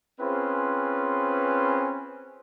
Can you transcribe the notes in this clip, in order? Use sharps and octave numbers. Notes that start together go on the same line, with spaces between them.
C4 C#4 F4 G#4 B4 C5